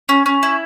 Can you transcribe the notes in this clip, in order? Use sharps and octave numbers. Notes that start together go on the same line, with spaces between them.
C#4
C#4
E4